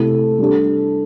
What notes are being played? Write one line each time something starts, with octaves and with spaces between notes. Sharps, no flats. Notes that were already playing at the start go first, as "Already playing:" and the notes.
Already playing: C3 A3 E4 A4
G3 D4 A4